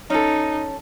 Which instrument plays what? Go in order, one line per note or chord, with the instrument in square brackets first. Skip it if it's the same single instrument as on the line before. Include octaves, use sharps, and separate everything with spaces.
[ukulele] C#4 A4 [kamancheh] D#4